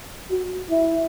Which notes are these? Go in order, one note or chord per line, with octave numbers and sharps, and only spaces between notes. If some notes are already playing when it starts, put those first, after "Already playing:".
F#4
E4